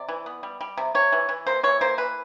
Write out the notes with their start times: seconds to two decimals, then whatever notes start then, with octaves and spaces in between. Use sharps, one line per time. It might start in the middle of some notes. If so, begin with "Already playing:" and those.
Already playing: C3 D5
0.09 E3
0.26 B3
0.43 G3
0.61 G3
0.77 C3
0.95 C3 C#5
1.12 E3
1.29 E3
1.47 A#3 C5
1.63 E3 C#5
1.81 A#3 C5
1.98 E3 B4